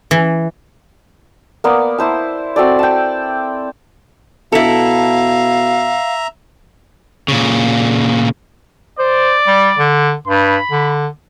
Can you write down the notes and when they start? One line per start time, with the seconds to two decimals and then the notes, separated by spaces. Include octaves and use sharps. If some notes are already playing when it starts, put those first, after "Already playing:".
0.11 E3
1.64 A#3 B3 D5
1.98 E4 C5 A5
2.56 C4 F#4 A4 D5
2.79 G5 A5
4.52 B2 E4 A4 E5 F5 A#5
7.28 A#2 C#3
8.99 C5 D5
9.47 G3
9.78 D3
10.28 G2 B5
10.71 D3